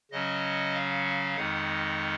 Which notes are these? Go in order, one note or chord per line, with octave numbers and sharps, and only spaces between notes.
C#3 F#3 C#4 D#5
F5
F2 D#3 G#3 D#4 F#5